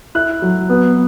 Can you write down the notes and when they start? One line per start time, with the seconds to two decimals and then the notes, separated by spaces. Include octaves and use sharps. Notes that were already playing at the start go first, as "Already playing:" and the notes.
0.15 E4 F#6
0.42 F#3
0.69 B3